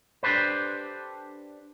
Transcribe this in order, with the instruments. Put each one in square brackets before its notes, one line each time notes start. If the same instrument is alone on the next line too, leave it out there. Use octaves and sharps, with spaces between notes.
[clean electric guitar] D4 G4 A4 B4 C5